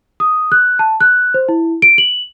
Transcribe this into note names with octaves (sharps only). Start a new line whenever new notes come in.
D#6
F#6
A5
F#6
C5
E4
D7
F#7